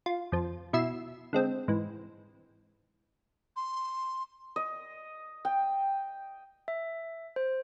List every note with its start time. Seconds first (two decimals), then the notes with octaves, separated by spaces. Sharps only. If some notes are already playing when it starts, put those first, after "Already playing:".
0.06 F4
0.32 F2 F3
0.73 B2 E4 E5 C7 E7
1.33 D3 G#3 C4
1.68 G#2 E3
3.56 C6
4.56 D#5
5.45 G5
6.68 E5
7.36 C5